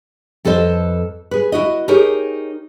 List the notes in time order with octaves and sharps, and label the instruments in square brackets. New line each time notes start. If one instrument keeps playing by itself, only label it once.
[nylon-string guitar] F2 A4 B4 C5 D#5
G#4 B4
E4 F#4 D#5
D#4 G4 G#4 A#4 C#5